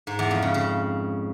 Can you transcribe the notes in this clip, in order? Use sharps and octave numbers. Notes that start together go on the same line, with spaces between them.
G#2
E2
F2
C#3
C#3